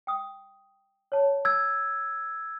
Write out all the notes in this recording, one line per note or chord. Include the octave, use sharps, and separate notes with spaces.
G5 D#6
C#5 A5
E6 G#6